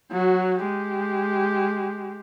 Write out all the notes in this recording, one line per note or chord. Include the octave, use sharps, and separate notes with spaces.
F#3 F#4
G#3 G4